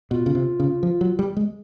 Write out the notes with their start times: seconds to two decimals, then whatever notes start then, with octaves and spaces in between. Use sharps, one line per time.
0.11 B2 F4
0.26 C#3
0.35 C3
0.60 C#3
0.83 F3
1.01 F#3
1.19 G3
1.37 G#3